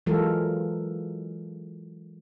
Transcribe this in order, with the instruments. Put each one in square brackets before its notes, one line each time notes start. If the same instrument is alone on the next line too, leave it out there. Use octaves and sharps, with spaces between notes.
[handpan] E3 F#3 G#3 F4 A4 A#4